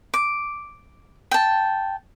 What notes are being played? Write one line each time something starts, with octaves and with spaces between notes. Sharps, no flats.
D6
G5 A5